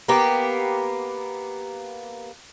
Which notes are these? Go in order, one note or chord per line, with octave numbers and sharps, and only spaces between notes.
A#3 B3 G4